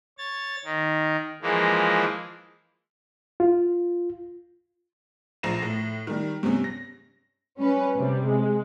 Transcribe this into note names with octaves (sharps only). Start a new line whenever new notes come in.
C#5 A6
D#3
E3 F3 G#3 A#3
F4
A#1 F3 A#5 A#6 C7 E7
A2
D#3 G3
G2 C3 B3 C#4
A#6
G3 C#4 B4
C3 G3
G#3